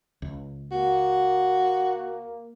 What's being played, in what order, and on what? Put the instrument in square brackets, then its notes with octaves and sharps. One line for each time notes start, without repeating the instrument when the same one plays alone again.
[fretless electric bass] C#2
[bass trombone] A#3 [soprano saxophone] F#4